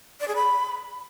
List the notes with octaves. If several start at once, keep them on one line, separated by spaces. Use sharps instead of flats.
D5
G#4
B5